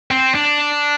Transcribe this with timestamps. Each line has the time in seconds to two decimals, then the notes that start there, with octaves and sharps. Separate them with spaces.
0.11 C4
0.35 D4